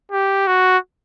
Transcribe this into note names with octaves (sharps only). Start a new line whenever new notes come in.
G4
F#4